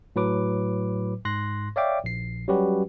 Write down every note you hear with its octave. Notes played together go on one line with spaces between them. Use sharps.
A2 F#3 B4 D6
G#2 C6 F#6 A#6
C#5 D5 E5 F5 G5 D6
A#1 C7
F#3 G3 C#4 F#4 G4 B4